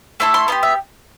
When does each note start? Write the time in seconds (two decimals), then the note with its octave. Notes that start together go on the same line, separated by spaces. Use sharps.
0.20 A3 E4 A4 C6
0.34 C6
0.48 B3 E4 G4 C6
0.63 E5